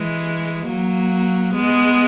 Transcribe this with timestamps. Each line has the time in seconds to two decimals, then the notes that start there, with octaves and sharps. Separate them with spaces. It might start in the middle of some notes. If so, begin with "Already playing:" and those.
Already playing: E3 G#3
0.67 F#3 A#3
1.55 G#3 B3